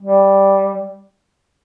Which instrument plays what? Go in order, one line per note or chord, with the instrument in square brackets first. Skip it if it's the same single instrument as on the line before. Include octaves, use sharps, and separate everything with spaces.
[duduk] G3